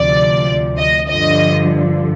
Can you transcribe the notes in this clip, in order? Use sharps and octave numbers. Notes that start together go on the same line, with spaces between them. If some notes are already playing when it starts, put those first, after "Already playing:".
Already playing: D2 C3 F3 D5
D#5
G2 D3 F3 D#5